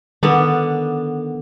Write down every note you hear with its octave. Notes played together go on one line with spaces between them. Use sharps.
D3 D#3 B3 D4